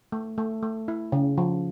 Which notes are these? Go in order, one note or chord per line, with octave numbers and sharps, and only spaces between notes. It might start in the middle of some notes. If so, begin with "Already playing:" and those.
A3
A3
A3
E4
C#3
F3